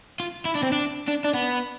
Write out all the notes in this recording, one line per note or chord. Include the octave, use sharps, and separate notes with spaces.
F4
E4
D4
C4
D4
D4
D4
B3